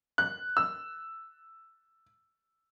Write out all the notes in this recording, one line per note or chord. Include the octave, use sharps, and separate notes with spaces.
F#6
E6